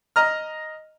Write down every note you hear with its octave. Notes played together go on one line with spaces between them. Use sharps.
D#5 A#5 F6